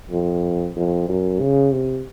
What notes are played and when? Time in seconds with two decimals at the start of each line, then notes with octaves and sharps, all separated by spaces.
0.11 F2
0.76 F2
1.09 F#2
1.40 C#3
1.72 C3